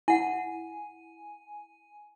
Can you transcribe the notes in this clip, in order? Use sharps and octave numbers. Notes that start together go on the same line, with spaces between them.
E4 F#5 G#5